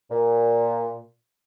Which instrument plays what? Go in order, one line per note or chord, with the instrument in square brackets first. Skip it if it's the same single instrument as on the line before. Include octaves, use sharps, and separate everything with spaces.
[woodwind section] A#2